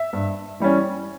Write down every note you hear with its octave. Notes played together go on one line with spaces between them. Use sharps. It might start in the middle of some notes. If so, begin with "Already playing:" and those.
Already playing: E5
G2
E3 G3 C#4